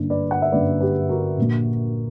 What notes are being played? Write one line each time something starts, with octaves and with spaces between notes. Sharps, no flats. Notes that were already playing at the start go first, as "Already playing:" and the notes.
Already playing: G1 F#2 D3 A#3
B4 D5
F#5
E5
G1 F#2 D3 A#3 B4 D5
G4 B4
F#4 A#4
A#1 A#2 A#3